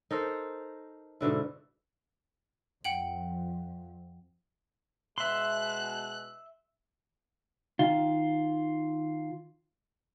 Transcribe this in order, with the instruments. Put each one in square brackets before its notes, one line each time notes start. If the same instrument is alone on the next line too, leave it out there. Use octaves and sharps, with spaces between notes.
[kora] D#4 A4 A#4 C5
G#2 B2 D3 E4
[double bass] F2 F3 [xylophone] F#5 G5 F#7
[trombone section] B2 G#3 [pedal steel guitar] E5 C6 [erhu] F#6
[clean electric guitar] D#3 F4